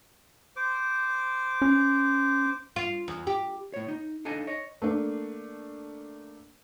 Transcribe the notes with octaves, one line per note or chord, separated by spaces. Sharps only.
C5 D6
C#4
F4
E2
G4
A2 C#5
D#4
D4 D#4 A4 F5 G#5 A#5
C#5 D#5
A3 A#3 D4